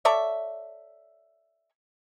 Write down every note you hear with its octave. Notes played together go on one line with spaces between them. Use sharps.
A4 C#5 D5 E5